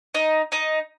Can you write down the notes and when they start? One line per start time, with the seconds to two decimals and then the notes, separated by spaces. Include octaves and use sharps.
0.14 D#4 D#5
0.52 D#4 D#5